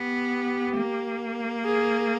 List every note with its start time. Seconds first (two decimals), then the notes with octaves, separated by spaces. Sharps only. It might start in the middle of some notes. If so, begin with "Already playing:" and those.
Already playing: B3 G4
0.77 A#3
1.65 G#4